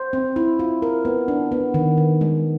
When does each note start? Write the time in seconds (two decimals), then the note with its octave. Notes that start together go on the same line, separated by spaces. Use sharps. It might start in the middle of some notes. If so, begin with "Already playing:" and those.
Already playing: C5
0.13 C4
0.36 E4
0.59 F4
0.82 A#4
1.05 B3
1.28 D4
1.52 B3
1.74 D#3
1.97 D#3
2.21 G#3